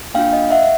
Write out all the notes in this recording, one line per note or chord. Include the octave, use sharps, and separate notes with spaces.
A#3 D4 F4 F5 G5
D#5 F5
E5 F#5